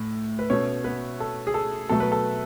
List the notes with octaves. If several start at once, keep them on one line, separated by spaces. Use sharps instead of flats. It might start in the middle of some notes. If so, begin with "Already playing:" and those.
Already playing: A2
B4
B2 A3 C#4 C#5
B3 B4
A4
G#4
A4
B2 F#3 A3 A4
B4
A4